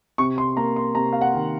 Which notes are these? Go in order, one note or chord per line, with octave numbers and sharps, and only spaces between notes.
C3 C#6
C6
A#3 A#5
C6
C3 A#5
F5
F#5
D#3